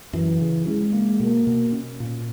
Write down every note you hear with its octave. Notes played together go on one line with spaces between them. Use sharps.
F#2 E3
C#3
G#3 C#4
A#3
B2 A#3
B2
C#4
A#2